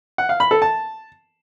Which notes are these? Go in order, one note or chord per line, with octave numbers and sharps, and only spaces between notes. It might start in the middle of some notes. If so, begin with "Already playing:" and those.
F#5
F5
B5
A4
A5